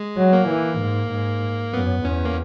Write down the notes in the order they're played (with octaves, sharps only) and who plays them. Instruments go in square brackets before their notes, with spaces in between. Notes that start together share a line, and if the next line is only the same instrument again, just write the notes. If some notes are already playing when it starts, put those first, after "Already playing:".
Already playing: [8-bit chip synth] G#3
[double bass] F#3
[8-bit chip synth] A#3
[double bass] E3
G#2
G#2
[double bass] F#2 [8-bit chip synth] B3
[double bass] E2 [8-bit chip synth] C#4
[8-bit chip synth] A#3